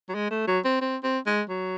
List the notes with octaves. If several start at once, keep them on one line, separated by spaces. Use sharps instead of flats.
F#3
G#3
A3
F#3
C4
C4
C4
G#3
F#3